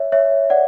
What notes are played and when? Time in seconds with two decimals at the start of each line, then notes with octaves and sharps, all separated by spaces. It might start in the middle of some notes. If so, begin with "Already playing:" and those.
Already playing: C#5 E5
0.12 C#5 E5
0.50 D5 F#5